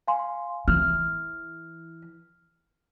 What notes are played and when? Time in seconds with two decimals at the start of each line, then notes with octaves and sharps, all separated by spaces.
0.08 F5 G#5 C6
0.68 E3 F6